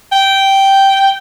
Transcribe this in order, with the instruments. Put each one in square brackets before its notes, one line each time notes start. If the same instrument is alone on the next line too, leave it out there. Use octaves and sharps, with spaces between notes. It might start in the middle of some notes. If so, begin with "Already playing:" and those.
[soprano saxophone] G5